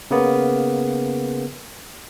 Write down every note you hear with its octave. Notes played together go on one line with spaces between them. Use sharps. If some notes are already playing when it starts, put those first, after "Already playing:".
C#3 A#3 B3